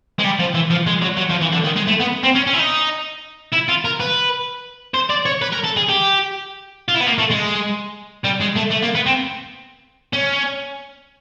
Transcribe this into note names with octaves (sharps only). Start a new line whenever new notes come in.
G#3
G3
F3
E3
F3
G#3
F#3
F#3
F3
E3
D3
D#3
G#3
A3
B3
C4
C#4
C#4
E4
D#4
E4
F4
A#4
B4
C5
D5
C#5
B4
A#4
A4
G#4
G4
F4
E4
B3
A#3
A3
G#3
G3
G#3
A3
A3
A#3
B3
C4
C#4